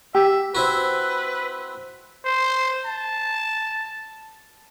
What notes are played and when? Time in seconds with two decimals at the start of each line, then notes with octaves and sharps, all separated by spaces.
0.15 G4 E5
0.55 C4 E4 F#4 B4
2.25 C5
2.86 A5